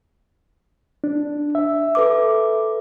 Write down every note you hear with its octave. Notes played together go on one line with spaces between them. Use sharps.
D4
E5
A4 B4 D6